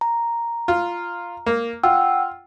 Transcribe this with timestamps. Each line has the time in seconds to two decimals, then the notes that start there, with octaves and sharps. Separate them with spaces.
0.01 A#5
0.68 F4
1.46 A#3
1.83 F4 F#5 G5 E6